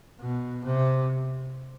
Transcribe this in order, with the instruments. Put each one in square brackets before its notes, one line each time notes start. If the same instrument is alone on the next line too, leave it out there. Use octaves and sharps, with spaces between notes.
[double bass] B2
C3